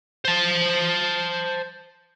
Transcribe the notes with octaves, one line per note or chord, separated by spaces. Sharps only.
C5 A5